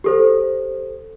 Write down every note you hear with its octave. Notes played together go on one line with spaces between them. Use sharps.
G4 A4 C5